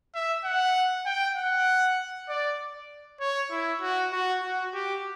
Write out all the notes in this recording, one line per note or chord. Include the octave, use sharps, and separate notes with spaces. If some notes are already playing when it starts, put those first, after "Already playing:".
E5
F#5
G5
F#5
D5
C#5
E4
F#4
F#4
F#4
G4